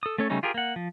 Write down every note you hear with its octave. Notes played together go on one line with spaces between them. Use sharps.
A4 D#6
A3 C#4 A4 C#5
C#3 G3 A3 C#4 D#4
F4 G4 G#4 A#4
A#3 F#5
F3